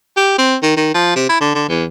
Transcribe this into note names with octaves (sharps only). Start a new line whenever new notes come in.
G4
C4
D#3
D#3
F3
C3
E4
D3
D3
E2